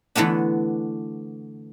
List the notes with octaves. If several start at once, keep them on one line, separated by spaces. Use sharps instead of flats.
D3 E3 A3 B3 D4